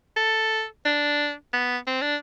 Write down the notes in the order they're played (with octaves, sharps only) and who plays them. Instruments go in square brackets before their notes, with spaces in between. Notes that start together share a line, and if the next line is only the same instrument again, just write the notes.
[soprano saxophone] A4
D4
B3
C4
D4